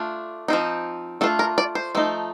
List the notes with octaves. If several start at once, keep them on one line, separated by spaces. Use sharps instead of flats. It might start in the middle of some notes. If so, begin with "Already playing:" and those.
Already playing: A3 D4 F4
F3 C4 D#4
A3 D4 F4 A4
A#4
D5
C5
F3 A3 D#4